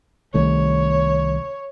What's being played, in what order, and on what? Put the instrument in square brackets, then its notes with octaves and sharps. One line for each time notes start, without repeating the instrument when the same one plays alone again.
[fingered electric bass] C2 D#3 A3 [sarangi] C#5